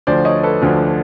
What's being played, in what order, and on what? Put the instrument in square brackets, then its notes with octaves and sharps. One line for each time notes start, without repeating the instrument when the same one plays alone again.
[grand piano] D2 D3 F3 C5 D5
C#5 D#5
A4 B4
D2 D3 F3